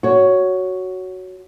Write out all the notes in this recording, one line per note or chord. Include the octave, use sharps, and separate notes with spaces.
F#4 C#5